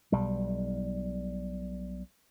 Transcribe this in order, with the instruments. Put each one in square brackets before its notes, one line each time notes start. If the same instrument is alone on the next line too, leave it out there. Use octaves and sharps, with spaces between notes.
[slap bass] B1 G3